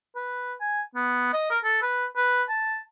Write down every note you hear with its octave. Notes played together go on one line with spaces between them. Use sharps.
B4
G#5
B3
D#5
A#4
A4
B4
B4
A5